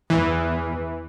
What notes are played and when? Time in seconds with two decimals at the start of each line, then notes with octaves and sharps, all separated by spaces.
0.10 E2 E3